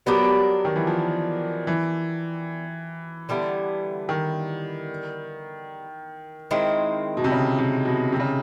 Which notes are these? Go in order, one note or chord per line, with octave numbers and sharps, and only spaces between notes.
F#3 B3 D4 G4 A#4
D#3
E3
F3
E3
D3 G3 B3 E4
D#3
D#3 G#3 C4 E4
B2
C3
C#3
C3
B2
C3
C#3